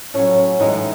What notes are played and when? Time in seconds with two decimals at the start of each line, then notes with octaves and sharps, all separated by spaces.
0.14 A2 F#3 C#4
0.60 A2 E3 G#3 D#4